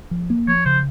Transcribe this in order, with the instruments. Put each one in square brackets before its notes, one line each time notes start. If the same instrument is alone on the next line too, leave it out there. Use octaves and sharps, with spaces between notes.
[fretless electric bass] F3
A#3
[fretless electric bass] F3 [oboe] C#5
[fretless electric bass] C#3 [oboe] C5